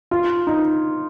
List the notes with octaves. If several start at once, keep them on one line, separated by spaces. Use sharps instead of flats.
F4
D#4